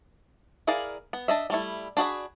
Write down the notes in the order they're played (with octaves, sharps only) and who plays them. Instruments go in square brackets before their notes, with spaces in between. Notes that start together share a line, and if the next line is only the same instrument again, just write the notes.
[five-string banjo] E4 G#4 A#4 D5 F5
B3
D4 D#5 E5
G3 A3 E4
D4 F#4 G#4 B5